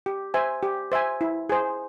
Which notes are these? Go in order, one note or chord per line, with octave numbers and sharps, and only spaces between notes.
G4
C5 E5 G#5
G4
C5 E5 G#5
E4
G#4 C5